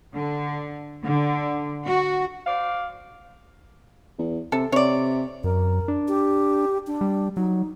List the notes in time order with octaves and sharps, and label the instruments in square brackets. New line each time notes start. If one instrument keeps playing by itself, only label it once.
[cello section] D3
D3
F#4
[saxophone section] C5 D5 F5
[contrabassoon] E2
[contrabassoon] C3 [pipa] A4
[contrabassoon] C3 [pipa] C#5 D5
[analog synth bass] F#2 [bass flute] A#4
[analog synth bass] D4
[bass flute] G4
D4
[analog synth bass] G3
[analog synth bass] F#3 [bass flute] D#4